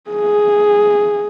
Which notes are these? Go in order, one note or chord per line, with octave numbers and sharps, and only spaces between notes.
G#4